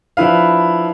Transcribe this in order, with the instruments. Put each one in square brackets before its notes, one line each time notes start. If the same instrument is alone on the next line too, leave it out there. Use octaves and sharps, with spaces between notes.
[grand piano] F3 D4 E4 B4 F5